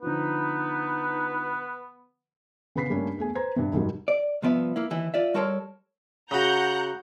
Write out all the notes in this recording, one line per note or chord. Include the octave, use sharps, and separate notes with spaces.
D3 F3 B3 D#4 B4
C#3 B3 B5 B6 C7
G2 G3 A3 A#3 C#4 D4
E2 A3 G#4 G#5
B4 C5 A#5 G#6
G2 C3
C2 F2 G#2 D#3 F#3 G3
D5
C2 F3 B3 D5 E5
A#3 E4
D#2 E3 E4
F4 D5 E5
G3 F#4 A4 A#4 C#5 C6
C#3 F#4 F#5 A#5 G6